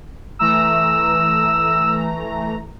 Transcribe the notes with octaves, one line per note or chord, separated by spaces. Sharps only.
E3 A3 A#5 E6